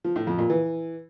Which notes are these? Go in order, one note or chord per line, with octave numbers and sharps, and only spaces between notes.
F3
A2
F2
A#2
E3